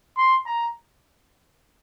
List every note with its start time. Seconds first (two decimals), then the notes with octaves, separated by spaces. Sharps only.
0.18 C6
0.46 A#5